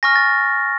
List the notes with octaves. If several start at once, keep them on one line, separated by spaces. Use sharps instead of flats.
G#5 C#6 F6 A#6
A6